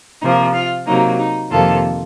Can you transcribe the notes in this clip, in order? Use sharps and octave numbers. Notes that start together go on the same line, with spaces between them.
C3 F3 A#3 D#4
F4
C3 F#3 A#3 D#4
D#4
F2 C3 D#3 A#3 F4 A4